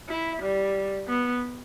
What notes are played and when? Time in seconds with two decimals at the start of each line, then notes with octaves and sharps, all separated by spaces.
0.09 E4
0.42 G3
1.08 B3